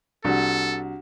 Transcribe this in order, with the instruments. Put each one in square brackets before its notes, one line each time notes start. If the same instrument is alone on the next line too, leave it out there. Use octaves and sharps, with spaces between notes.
[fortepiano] C2 [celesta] D4 F#4 F#5 [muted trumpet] A4